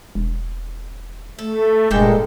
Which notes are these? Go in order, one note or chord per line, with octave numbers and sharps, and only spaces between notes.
E1
A3 A4
F1 G2 A#2 G#3 A#3 A4 G5